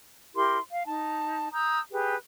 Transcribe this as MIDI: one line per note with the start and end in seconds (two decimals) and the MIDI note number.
0.34 0.58 64
0.34 0.58 67
0.34 0.58 70
0.34 0.58 84
0.70 0.86 77
0.86 1.49 63
0.86 1.49 81
1.53 1.79 82
1.53 1.79 87
1.53 1.79 88
1.53 1.79 91
1.91 2.15 67
1.91 2.15 68
1.91 2.15 71